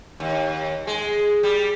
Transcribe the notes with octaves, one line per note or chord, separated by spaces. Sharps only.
D#2
G#3
G3